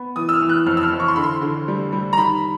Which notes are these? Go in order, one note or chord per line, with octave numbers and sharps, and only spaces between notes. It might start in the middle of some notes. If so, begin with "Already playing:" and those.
Already playing: B3
E3 D#6
E6
F6
E3
F#6
F2 F6
E6
F6
E3
C#6
C6
D3 B5
C6
D3
G3
G3
A#5
D#3 B5